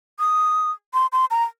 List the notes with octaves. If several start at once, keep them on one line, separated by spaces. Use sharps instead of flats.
D#6
C6
C6
A#5